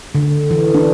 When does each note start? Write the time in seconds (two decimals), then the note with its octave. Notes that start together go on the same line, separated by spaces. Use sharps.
0.15 D3
0.51 E3
0.75 D4